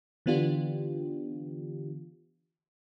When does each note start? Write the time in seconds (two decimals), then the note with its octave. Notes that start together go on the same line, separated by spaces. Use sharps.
0.26 D3 E3 B3 D4 F4 G4